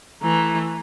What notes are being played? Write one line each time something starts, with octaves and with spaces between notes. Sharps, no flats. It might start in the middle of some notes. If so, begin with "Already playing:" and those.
E3 A3 A#5